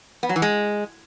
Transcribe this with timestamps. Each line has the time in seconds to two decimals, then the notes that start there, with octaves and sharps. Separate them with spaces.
0.23 B3
0.29 F#3
0.36 E3
0.42 G#3